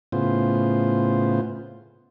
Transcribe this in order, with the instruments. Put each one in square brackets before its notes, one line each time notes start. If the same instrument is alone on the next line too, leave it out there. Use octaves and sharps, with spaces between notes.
[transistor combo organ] A2 C#3 B3 F4 C5